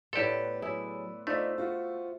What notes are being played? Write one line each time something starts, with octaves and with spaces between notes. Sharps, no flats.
A2 B3 G4 A4 B4 D5 C6
F#3 E4 G#4
A3 D#4 F4 C5 D5 E5
F4 F#4